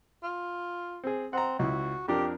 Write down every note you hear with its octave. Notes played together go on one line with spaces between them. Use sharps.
F4
C4 G#4
C4 F#5 A#5
C#2 E4 F#4
F2 D4 G4 A#4